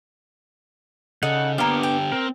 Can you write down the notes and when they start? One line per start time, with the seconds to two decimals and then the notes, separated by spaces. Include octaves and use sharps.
1.23 C#3 D#4 A4 F#5
1.58 D3 A#3 B3 D4 G4 F5
1.83 G5
2.12 C4 A#4